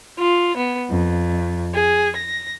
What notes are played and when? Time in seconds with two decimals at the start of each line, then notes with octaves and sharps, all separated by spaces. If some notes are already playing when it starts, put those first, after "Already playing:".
0.19 F4
0.57 B3
0.91 F2
1.74 G#4
2.17 A#6